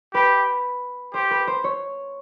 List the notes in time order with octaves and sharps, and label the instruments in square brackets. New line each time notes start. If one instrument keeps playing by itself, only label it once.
[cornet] G4 [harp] B4
[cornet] G4 [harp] C5
[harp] B4
C5
C#5